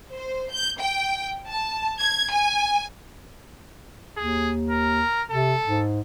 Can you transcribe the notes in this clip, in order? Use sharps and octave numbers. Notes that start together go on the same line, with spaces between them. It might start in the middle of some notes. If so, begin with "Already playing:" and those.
C5
G6
G5
A5
G#6
G#5
D#2 G#4
A#4
C3 A4
G#2